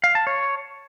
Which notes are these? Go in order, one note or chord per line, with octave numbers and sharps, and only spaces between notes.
F5
A5
C#5